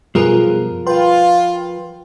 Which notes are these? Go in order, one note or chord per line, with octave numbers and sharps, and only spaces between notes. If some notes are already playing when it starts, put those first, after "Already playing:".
F#2 B2 F3 G3 B3 F4 G#4 A#4
F4 B4 G5 C6